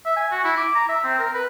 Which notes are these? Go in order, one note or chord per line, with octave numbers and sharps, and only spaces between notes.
E5
G#5
F#4
E4
D6
A#5
E5
C4
A#4
B4